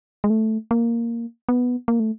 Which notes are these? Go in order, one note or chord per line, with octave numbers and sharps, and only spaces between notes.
G#3
A3
A#3
B3
A#3
A3